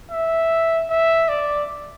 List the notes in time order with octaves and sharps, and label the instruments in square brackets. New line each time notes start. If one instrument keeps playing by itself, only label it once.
[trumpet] E5
E5
D5